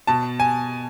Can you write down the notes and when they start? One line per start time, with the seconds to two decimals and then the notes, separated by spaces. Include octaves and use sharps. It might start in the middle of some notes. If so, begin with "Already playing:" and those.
0.07 B2 A5
0.40 G#5